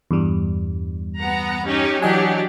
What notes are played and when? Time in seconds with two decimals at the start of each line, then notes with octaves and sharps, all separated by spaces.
0.11 E2 G2 G3
1.18 B3 F#5 A#5
1.65 C#4 D#4 G4
2.02 E3 F#3 D4 G4 D#5 G#5